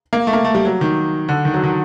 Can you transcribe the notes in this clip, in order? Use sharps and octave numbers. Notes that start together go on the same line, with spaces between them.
A#3
A3
A#3
A3
G3
F#3
D#3
D3
D#3
F#3
D#3